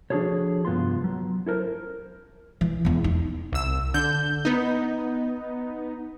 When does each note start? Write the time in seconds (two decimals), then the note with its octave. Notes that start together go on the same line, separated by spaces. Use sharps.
0.10 F3 D4 F#4 G#4 A4 C#5
0.65 C2 G2 B3 F4 C6
1.04 F#3
1.46 E4 A4 A#4 C5
2.61 E3
2.85 E2 B3
3.04 D#4
3.53 C2 E6
3.94 D3 G6
4.45 B3 D#4